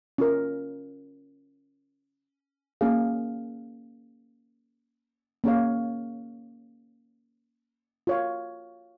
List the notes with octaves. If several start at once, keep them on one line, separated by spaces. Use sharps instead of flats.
C#4 F4 A#4
A#3 C#4 G#4 F5
A#3 C#4 G#4 C#5 F5
F4 C#5 F5